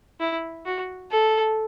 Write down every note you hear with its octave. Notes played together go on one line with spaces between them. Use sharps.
E4
F#4
A4